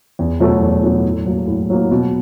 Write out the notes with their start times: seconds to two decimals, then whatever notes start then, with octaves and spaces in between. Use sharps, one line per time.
0.19 E2
0.40 B2 F#3 A3
0.62 E2
0.83 B2 F#3 A3
1.05 A2
1.26 F#3 A#3
1.47 A2
1.70 F#3 A#3
1.91 B2